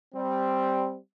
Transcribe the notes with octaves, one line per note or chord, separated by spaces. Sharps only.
G3 C4